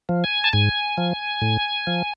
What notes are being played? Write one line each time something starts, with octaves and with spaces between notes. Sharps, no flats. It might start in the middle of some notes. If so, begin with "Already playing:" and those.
F3
G#5
A5
G#2 G#5
F3
A2
F3